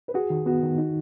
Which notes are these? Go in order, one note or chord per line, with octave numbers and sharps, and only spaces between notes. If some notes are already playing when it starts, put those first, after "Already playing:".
B4
F#4 G#4
D#3
B3 F#4
D#3
D#4